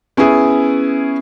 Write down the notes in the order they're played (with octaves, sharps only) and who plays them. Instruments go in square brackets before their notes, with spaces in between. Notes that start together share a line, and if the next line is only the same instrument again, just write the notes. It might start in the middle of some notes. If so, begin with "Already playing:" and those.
[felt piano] B3 C#4 E4 G#4